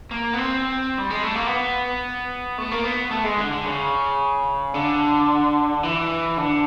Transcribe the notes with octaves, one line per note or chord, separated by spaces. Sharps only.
A#3
B3
C4
G3
G#3
A3
A#3
B3
A3
A#3
B3
A3
G#3
D3
D3
C#3
D3
E3
D3